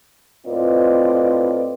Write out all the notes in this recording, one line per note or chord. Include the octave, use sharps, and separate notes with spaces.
A2 C4 F4 B4 D5 D#5